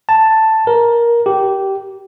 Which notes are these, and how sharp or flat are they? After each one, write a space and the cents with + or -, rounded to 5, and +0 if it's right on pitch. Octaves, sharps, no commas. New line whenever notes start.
A5 +5
A#4 +15
G4 -15